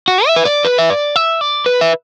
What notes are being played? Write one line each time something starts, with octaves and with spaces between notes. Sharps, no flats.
F#4
E5
B4
D5
B4
E5
D5
E5
D5
B4
E5